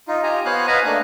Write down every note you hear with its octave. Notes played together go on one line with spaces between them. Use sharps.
D#4 F4
F4 G4 D#5 G#5 A#5
B3 C5 C#5 F5 G#5 F#6
B4 D#5 F5 F#5 G#5 A#5
A3 A#3 D4 F#6